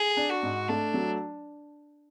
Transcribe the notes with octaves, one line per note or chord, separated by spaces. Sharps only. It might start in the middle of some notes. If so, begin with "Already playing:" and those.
Already playing: G#4
D4
F#4
G#2
A3 D4
F#3